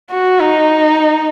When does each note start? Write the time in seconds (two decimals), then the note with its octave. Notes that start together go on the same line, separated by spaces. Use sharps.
0.11 F#4
0.40 D#4